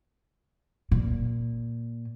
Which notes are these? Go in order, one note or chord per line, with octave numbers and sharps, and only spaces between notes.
A#2